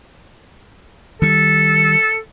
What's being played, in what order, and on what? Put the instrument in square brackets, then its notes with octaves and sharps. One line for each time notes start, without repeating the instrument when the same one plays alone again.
[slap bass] D#3 G3 [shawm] A4